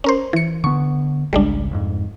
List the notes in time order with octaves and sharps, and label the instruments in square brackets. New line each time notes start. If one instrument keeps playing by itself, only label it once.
[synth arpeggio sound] C#4 A#4 C5
E3 C#7
[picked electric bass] D3 B3 [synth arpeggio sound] C#6
[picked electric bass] G#1 C#2 C#3 [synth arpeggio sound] G3 G#3 D4
[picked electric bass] F2 G#2